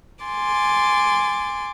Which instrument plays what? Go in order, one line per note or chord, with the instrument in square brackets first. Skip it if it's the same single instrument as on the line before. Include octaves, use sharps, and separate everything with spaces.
[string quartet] G#5 C6 D6 A6